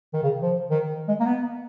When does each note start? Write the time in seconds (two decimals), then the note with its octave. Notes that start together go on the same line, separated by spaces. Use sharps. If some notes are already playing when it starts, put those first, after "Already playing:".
0.13 D#3
0.23 C#3
0.42 F3
0.70 D#3
1.08 G#3
1.20 A#3
1.26 B3